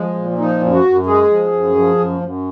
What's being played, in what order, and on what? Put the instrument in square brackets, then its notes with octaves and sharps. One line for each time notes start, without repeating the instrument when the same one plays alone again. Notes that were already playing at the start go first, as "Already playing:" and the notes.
Already playing: [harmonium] F3 G#3
A#2
F3 D#4
F#2
F#4
F#2
G#3 G#4
F3
F#2
F3
F#2
F#2